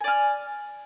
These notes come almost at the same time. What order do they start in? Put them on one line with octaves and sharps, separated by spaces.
G#5 D5 F6